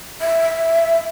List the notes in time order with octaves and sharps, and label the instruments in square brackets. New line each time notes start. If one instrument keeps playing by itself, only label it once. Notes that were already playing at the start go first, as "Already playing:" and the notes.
[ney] E5